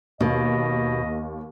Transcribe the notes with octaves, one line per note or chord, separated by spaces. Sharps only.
D#2 B2 D#5